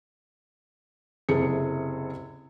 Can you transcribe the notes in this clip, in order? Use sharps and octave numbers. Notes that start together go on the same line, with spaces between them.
F#1 C3 E4 G#4 A4 C#7